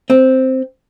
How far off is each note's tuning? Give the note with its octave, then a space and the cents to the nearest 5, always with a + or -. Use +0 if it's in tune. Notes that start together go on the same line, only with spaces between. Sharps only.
C4 +0